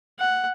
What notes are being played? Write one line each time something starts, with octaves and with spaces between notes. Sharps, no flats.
F#5